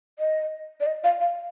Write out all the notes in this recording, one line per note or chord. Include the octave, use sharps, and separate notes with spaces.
D#5
D5
D#5
F5
F5